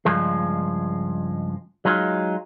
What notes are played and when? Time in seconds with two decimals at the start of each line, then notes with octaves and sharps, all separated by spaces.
0.05 C#2 G2 F3 G#3
1.85 F#3 G#3 D#4 F4